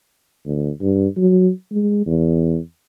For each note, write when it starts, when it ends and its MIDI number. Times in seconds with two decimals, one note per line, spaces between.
0.46 0.70 38
0.81 1.07 43
1.17 1.50 54
1.72 2.04 56
2.06 2.58 40